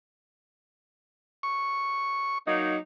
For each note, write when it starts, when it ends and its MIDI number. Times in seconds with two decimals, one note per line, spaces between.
1.43 2.38 85
2.46 2.75 54
2.46 2.75 58
2.46 2.75 63